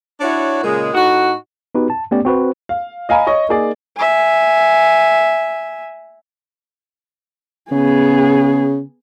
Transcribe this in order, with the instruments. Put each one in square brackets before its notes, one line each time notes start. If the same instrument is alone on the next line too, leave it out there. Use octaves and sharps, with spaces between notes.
[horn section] D4 E4 F#4 C#5
A#2 C#3 G#3
A2 D#4 F#4
[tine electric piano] B3 D#4 F#4 G4 B4
A5
A3 B3 C#4 G4 D5
C4 F#4 B4 C5
[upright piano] F5
D#5 F5 G#5 A#5 B5
C#5 D#5 C#6
A#3 D#4 G#4 D5
[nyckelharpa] E5 G#5
[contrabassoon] C#3 [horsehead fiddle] B3 G#4